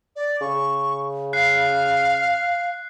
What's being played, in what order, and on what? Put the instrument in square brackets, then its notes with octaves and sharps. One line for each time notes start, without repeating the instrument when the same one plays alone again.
[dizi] D5
[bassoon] C#3 [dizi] C#6
[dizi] F5 [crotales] F#6 C7